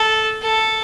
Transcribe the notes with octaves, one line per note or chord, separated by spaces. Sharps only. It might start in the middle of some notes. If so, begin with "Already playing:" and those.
Already playing: A4
A4